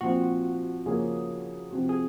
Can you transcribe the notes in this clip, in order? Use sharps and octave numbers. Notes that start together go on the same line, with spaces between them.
A#2 F3 C4 F#4
C#3 F3 A#3 C#4 G#4
C3 F3 C4 F#4
G#4